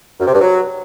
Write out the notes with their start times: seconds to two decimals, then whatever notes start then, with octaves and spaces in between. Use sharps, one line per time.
0.20 F#2
0.27 C3
0.34 G2
0.41 F#3